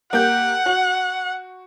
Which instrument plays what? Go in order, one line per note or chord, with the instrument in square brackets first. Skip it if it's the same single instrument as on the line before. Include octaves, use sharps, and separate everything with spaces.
[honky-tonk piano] A#3 G4 G6 [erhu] F#5
[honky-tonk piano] F#4 F#7